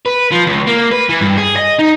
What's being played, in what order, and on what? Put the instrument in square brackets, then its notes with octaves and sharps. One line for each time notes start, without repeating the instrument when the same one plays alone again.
[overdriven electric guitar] B4
F3
C#2
A#3
B4
E3
G2
G#4
D#5
D#4